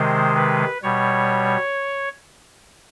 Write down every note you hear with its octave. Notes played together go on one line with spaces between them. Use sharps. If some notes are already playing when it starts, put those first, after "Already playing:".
Already playing: C3 D#3 G#3 C5
B4
B2 G3 C#5